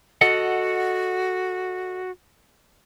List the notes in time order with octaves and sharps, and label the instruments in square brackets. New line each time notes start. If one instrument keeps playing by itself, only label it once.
[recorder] F#4 [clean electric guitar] A4 D#5 F#5